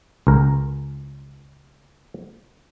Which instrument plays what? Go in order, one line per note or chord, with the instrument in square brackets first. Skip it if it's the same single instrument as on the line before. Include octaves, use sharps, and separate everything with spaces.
[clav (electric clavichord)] C#2 A#4